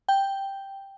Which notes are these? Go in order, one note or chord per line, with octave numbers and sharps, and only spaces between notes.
G5